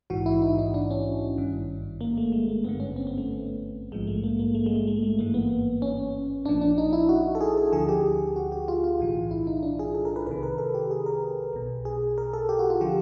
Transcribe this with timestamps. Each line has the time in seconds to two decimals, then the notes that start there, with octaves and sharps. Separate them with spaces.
0.10 A#1 G#2 E3 F#4
0.26 E4
0.42 D#4
0.58 D#4
0.74 D4
0.91 C#4
1.38 G#1 G2 D#3
2.01 A#3
2.17 A3
2.32 G#3
2.49 A#3
2.64 G#1 G2 D3 B3
2.80 C#4
2.96 C4
3.07 B3
3.18 A3
3.92 A#1 G#2 F3 G#3
4.07 A3
4.24 A#3
4.39 A#3
4.55 A3
4.66 G#3
4.76 A3
4.87 A3
5.03 A3
5.18 G#1 G2 E3 A#3
5.34 B3
5.82 C#4
6.45 A#1 A#2 F3 D4
6.61 D4
6.78 D#4
6.93 E4
7.09 F#4
7.35 A4
7.41 G#4
7.57 A4
7.72 D2 D3 F3 G#4
7.89 G4
8.36 F#4
8.52 G4
8.68 F4
8.84 F4
8.99 B1 A2 E3
9.31 E4
9.47 D#4
9.63 D4
9.79 G#4
9.95 A4
10.05 A#4
10.16 B4
10.27 C2 C3 D#3 B4
10.43 A#4
10.58 A4
10.74 G4
10.91 G#4
11.06 A#4
11.53 B1 B2
11.85 G#4
12.18 A#4
12.33 A4
12.49 G4
12.59 F#4
12.70 F4
12.81 D3 F3 G4